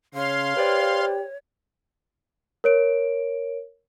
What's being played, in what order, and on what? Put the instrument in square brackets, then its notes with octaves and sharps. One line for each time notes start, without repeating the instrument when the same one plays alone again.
[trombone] C#3 [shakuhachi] C#5 [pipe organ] F5 C6
[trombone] G4 [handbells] B4 C5 D5
[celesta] A#4 C#5 D7